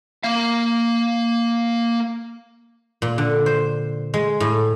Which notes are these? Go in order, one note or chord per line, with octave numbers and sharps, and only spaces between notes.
A#3 F5
A#2
D3
C5
G#3
A2